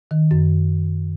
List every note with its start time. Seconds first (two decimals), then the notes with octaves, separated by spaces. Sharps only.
0.11 D#3
0.31 F#2